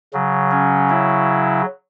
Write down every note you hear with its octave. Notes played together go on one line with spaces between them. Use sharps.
C#3 F#3
C#4
E4